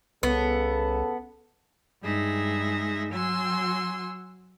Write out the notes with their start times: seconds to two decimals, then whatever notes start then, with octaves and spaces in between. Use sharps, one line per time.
0.23 C2 C#3 B3 A4
2.02 G2 G#3 D#4 G#4 E5 A#6
3.12 F#3 F#4 G#5 C6 E6